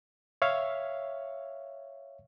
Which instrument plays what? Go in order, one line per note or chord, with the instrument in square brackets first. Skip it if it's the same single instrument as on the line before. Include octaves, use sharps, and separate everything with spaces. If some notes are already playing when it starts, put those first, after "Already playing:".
[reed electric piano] C#5 E5 F5